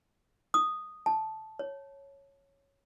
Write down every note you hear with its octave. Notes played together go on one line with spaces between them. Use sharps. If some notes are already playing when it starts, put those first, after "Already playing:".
D#6
A5
C#5